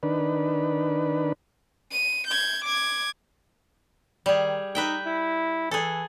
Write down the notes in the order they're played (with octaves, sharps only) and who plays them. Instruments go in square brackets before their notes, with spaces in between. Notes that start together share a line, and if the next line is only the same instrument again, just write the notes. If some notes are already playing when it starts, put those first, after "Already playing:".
[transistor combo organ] D#3 D4 B4
[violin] D#7
G6 G#6
D6 G#6
[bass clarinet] D#3 [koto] G3 G#4
[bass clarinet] D#4 [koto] B4 E5 G5
[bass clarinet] E4
[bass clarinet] E3 [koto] G#4 A4